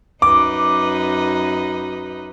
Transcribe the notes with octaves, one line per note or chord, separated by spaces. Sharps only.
F#2 D#4 B4 D6